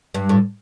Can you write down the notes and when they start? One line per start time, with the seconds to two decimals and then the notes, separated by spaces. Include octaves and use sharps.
0.14 G2
0.29 A2